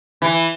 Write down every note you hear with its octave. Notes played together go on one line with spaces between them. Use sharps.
E3